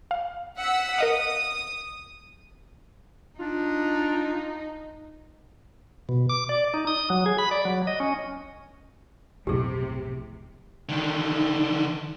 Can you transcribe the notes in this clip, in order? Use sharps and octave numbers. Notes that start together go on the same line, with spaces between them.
F5
F#5 E6 B6
A#4 D#5 F5 D#6
D4 D#4 F4
B2
D6
D5
D#4
D#6
F#3
G#4
B5
D5
F#3
D#5
C#4
B1 F2 A2 C3 G4 G#4
D3 D#3